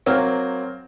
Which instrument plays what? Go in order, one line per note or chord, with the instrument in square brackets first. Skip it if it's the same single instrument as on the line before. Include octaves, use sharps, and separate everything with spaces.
[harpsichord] F#3 A#3 [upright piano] C4